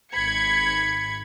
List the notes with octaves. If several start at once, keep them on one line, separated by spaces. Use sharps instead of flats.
G#1 B5 G#6 C#7